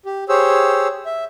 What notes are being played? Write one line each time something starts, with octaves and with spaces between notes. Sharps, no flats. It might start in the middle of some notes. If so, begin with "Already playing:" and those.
G4
G4 G#4 C5 C#5 E6
E5